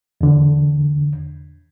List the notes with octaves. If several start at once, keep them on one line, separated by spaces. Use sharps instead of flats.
E2 D3